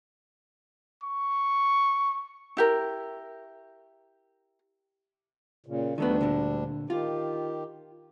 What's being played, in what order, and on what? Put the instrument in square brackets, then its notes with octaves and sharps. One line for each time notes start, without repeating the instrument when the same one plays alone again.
[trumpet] C#6
[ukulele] E4 G4 A#4
[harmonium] A#2 C#3
[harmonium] D2 G3 D4 [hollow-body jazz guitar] D#3 A3 B3
[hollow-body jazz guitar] A#2 D3
[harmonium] D#3 G4 [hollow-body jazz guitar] F4